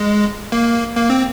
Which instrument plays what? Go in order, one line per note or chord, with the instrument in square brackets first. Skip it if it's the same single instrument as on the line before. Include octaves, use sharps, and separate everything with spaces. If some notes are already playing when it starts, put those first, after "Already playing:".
Already playing: [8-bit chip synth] G#3
A#3
A#3
C4